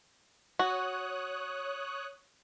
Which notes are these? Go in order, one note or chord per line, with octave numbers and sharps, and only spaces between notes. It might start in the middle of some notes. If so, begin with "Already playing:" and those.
F#4 C#5 D#6 F#6